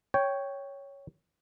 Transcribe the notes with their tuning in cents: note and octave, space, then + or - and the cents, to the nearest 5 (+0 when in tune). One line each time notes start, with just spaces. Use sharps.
C#5 +0 G5 +0